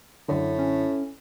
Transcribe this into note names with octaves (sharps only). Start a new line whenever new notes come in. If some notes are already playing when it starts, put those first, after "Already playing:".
F#2 A2 D3
C#4